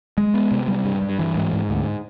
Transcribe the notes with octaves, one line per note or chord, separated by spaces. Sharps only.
G#3
B3
C3
G3
G2
G2
E3
G#2
G#2
D2